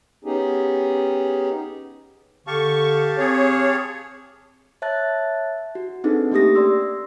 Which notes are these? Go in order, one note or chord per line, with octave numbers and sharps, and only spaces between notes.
B3 C#4 D#4 G4 G#4
D3 G4 F5 A5 C#6
C4 G#4 C#5
C#5 E5 A5 F#6 A6
F#4
C4 D4 D#4 G#4 A4 B4
A3 A#3 C#4 G4 D#6 A#6
D5 C6 E6 A#6